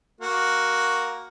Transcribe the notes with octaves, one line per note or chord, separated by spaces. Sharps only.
A#3 F#4